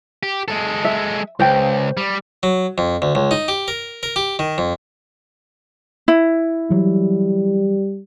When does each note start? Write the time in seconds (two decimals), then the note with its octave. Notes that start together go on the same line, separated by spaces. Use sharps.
0.23 G4
0.48 G#3 A4
0.85 E5
1.40 C#2 C5 G5
1.97 G3
2.43 F#3
2.78 F2
3.02 D2
3.15 C#2
3.31 D#4
3.48 G4
3.68 A#4
4.03 A#4
4.16 G4
4.39 D#3
4.58 F2
6.08 E4
6.70 E3 F#3 G3